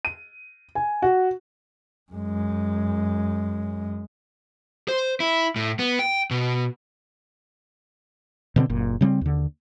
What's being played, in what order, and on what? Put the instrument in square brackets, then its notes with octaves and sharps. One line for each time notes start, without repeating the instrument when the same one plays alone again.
[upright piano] D#7
G#5
F#4
[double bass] F#2 G#3
[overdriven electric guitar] C5
E4
A2
B3
G5
B2
[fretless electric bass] B2 D3 F3 C4
F#1 A#2
C#3 G3 A3 C4
D#2 D3